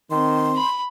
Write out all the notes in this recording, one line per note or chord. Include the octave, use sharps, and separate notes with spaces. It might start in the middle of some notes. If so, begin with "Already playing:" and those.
D#3 C4 C6
B5